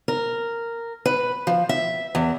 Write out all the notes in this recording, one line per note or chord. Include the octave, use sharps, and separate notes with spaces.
A#4
B4
F3
E5
E2